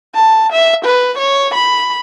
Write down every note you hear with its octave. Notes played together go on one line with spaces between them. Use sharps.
A5
E5
B4
C#5
B5